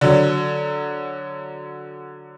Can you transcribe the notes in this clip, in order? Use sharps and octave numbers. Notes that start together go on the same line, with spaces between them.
D3 F#3